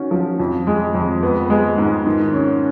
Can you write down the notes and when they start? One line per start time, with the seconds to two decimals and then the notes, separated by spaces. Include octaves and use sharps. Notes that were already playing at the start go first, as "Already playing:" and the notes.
Already playing: D#3 C#4 F#4
0.11 F3
0.40 F2
0.67 G#3
0.95 F2
1.23 B3
1.50 G#3
1.78 G#2
2.06 D#3
2.33 C#4